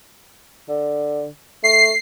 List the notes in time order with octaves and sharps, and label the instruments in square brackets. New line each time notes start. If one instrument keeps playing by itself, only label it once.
[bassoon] D3
[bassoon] A3 [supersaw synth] C7